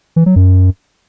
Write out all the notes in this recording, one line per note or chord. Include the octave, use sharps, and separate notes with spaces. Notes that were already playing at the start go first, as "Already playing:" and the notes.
E3
F#3
F#2